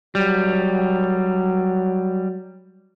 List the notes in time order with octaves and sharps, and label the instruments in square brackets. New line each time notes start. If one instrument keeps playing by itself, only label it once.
[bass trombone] F#3 [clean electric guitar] G3